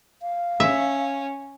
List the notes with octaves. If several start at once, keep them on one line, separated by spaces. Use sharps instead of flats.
F5
C#4 E5